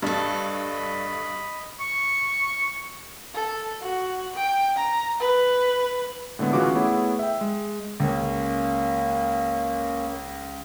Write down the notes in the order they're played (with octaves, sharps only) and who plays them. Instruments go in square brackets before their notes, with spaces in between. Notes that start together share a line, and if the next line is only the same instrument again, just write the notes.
[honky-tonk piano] G2 [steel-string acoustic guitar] D4 A4 [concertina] D#5 B5
[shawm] C#6
[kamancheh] A4
F#4
G5
A#5
B4
[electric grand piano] A2 D3 G#3 B3
A1 C#3 E3 F4 F#4 D6
A3 B3 E4 G#4 C#5 F#5
E5 G5
G#3
[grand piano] C#2 [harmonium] A#3 C#4